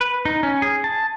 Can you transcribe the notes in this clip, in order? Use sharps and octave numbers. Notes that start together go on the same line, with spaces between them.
B4
D#4
C#4
G#4
A5